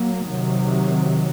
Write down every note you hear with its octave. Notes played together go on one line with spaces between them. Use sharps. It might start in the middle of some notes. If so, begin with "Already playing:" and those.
Already playing: F#3 A#3
C3 D#3 F#3